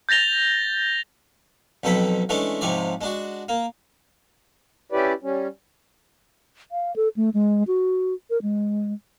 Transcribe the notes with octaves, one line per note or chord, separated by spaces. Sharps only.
G6 A6 A#6 F7 G7
B1 F2 B3 A4 G5 B5
E3 G#3 A3 C#4 D4
G#2 C3 F3 C#5 D5
G#3 D4 F#4
A#3
C#4 E4 G4 B4 D5
G3 C#4
F5
A4
A3
G#3
F#4
A#4
G#3